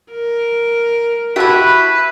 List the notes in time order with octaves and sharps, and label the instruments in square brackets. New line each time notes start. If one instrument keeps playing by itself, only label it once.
[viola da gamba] A#4
[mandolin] E4 E5 [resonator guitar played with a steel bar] F#4 G4 A5 [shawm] B4